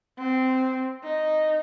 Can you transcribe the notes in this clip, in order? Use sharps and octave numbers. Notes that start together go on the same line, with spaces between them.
C4
D#4